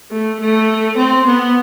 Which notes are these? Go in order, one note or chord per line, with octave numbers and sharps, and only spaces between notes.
A3
A3
C4
B3